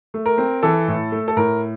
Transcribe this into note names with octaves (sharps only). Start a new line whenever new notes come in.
A3
A#4
C4
E3 A4
A2
A3
A4
A2 A#4